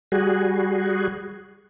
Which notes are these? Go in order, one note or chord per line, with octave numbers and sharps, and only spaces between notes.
G3 F#4 G#4